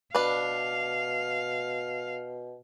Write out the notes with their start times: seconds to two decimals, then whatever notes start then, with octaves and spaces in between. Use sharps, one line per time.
0.15 B2 D4 B4 F5